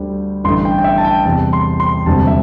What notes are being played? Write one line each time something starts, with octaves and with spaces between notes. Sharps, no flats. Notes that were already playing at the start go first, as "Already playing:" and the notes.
Already playing: D2 D3 G3
A1 G2 D3 A3 C6
G5
G5
E5
A5
G5
E2 C3 G3 A5
C6
C6
E1 D2 C3 G3 A5
E5